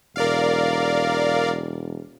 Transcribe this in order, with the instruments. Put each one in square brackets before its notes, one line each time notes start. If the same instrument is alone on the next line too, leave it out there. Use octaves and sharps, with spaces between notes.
[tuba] E1 [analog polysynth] A#4 D5 F5